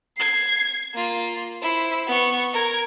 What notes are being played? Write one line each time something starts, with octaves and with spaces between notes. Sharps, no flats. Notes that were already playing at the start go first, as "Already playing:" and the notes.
G#6 C7
A#3 F4
E4 C5
B3 C#6
A#4 G#6